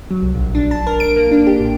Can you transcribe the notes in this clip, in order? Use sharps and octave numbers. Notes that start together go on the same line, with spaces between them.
F#3
C2
A#1
D4
A5
A#4
D7
A#3
D4
G4
A1